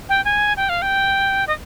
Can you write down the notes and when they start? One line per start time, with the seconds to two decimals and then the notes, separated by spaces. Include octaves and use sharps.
0.09 G5
0.25 G#5
0.57 G5
0.69 F5
0.82 G5
1.47 D#5